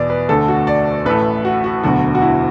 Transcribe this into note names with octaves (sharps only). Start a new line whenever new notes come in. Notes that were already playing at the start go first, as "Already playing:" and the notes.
Already playing: E2 B2 D5
B4
D2 D3 A3 A4
F#4
D5
A1 A2 A3 B4
F#4
F#4
E1 D2 D3 F#3 F#4
F#4
E4